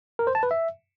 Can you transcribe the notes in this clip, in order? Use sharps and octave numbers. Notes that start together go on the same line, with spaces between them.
A#4
C5
A5
B4
E5